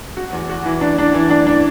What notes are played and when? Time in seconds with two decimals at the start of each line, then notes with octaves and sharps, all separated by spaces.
0.17 F#4
0.33 E2
0.50 F#4
0.66 E3
0.81 D4
0.98 D4
1.14 E3
1.30 D4
1.47 D4